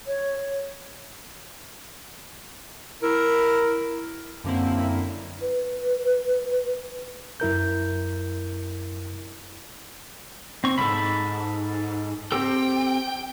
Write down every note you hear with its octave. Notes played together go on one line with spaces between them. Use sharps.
C#5
E4 A#4
F#2 D3 A#3 C4 E4
B4
F#2 E4 A#4 G6
C4 C#6
C2 G#2 A4 B5
C4 G4 A4 G5